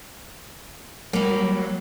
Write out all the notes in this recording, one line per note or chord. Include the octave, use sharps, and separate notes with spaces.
F#3 G3 A#3